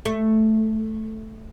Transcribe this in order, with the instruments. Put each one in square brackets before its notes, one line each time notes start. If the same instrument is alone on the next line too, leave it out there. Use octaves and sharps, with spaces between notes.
[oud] A3